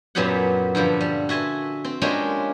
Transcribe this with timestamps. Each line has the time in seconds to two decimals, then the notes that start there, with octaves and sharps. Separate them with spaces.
0.15 F#2 A#2 F#3 B3 G4 F#5
0.75 G2 D3 F3 G3
1.01 G3
1.29 F#4 E5 G#5 A5 C6
1.85 C4
2.02 G#3 A#3 C#4 D4 F4 G4